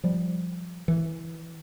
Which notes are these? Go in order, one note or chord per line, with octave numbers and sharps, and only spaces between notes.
F3 G3
E3